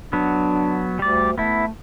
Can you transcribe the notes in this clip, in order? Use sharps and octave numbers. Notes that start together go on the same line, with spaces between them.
F#3 B3 D4
D2 G3 D5
A3 B3 E4